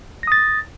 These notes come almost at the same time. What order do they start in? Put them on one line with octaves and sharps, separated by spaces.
A#6 D#6 A6